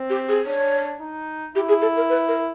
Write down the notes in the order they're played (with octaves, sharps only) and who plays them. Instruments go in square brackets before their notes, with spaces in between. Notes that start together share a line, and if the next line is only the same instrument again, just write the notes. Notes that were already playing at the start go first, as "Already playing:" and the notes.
Already playing: [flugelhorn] C4
[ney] G4
G#4
[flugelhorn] D4 [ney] C#5
[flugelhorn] D#4
[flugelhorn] E4 [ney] G4
[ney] G#4
A4
A#4
B4
A#4